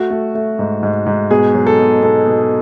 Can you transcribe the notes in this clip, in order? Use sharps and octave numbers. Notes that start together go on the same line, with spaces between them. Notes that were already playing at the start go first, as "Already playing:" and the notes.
Already playing: A3 F#4
A3
A3
G#2
G#2
G#2
B2 G#4
F#3
A4
B2
B2 A4
B2